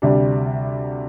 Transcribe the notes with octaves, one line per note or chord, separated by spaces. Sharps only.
D2 C3 G3 D4